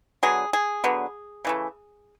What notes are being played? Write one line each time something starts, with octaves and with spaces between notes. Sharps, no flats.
D3 F#3 B3 G#4
G#4
D3 F#3 B3
C#3 E3 A3